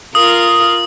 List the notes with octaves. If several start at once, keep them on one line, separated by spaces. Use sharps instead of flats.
F4 A#4 D#6